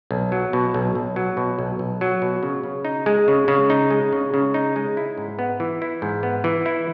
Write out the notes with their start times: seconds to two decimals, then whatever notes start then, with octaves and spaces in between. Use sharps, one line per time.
0.11 B1
0.32 F#3
0.53 B2
0.74 B1
0.95 B1
1.16 F#3
1.37 B2
1.59 B1
1.79 B1
2.01 F#3
2.22 B2
2.43 C#3
2.63 C#3
2.85 D#4
3.06 G#3
3.28 C#3
3.48 C#3
3.70 D#4
3.90 G#3
4.13 C#3
4.34 C#3
4.54 D#4
4.76 G#3
4.97 E4
5.18 G#2
5.39 B3
5.60 E3
5.82 E4
6.02 G#2
6.23 B3
6.44 E3
6.66 E4